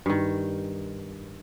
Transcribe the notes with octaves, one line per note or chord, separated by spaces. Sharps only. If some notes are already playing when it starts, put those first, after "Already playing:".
G2 D#3